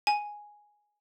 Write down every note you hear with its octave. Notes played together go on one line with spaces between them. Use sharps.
G#5